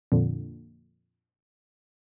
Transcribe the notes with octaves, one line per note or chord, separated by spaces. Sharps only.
F2 A#2 D3